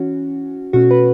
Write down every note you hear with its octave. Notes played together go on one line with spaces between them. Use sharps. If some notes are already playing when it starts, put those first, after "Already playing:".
Already playing: E3 C#4 F#4
B2 A3 C#4 F#4
B4